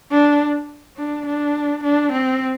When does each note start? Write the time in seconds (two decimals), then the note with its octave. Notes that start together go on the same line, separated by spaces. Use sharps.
0.11 D4
0.97 D4
1.26 D4
1.84 D4
2.12 C4